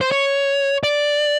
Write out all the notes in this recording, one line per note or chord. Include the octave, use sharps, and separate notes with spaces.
C5
C#5
D5